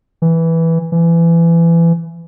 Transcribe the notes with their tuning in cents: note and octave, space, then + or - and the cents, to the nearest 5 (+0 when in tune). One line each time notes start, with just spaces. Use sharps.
E3 -5
E3 +25